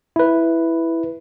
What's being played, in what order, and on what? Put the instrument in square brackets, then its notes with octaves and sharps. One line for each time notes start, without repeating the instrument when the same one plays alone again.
[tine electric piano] E4 B4